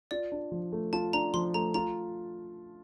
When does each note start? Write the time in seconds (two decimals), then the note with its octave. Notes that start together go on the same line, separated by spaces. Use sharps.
0.11 F4 D5
0.32 D4
0.52 F3
0.72 A3
0.93 F4 A5
1.13 D4 A#5
1.34 F3 C6
1.54 A3 A#5
1.74 F4 A#5